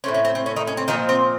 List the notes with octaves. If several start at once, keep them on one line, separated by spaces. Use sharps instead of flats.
A2 A3 C4 C#4
C#4
C4
C4
C#4
D#3 D#4
C#4
C4
A#2 D#3 F3 A3 C4 D#4
C4